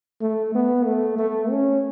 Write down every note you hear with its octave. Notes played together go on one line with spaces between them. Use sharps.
A3
B3
A3
A3
C#4